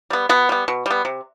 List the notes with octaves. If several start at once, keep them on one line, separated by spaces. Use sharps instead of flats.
G3 B3
B2 B3
G3 B3
B2
G3 B3
C3